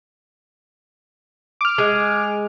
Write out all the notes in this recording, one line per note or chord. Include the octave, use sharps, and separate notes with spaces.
D6 F6
G#3